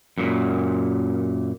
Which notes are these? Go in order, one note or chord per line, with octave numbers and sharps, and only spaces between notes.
F#2 A#2